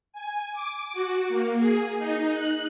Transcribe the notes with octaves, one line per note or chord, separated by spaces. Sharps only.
G#5
D6
F#4
A#3
G#4
D#4
F#6